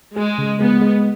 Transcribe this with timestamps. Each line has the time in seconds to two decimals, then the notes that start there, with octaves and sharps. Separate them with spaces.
0.16 G#3 G#4
0.38 C#3
0.61 G#3 B3
0.81 G#3